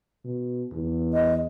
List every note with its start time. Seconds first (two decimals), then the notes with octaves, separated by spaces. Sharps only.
0.25 B2
0.72 E2
1.14 D#5